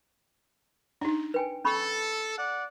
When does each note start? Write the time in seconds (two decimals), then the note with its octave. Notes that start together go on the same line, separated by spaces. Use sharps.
1.01 D4 D#4
1.34 B4 G5 G#5
1.65 C#4 A4 B5 C#6
2.38 D5 F#5